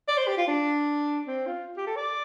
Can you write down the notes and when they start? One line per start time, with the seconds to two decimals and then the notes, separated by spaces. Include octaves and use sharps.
0.08 D5
0.18 C5
0.28 G4
0.38 F4
0.48 D4
1.27 C4
1.47 F4
1.77 G4
1.87 A4
1.97 D5